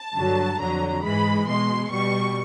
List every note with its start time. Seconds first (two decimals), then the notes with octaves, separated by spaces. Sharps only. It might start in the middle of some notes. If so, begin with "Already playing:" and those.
Already playing: A5
0.15 G2 D3 F#3
0.60 F2 D3 F#3 A#5
1.04 G#2 E3 G#3 B5
1.47 B2 G#3 C6
1.91 B2 G3 C#6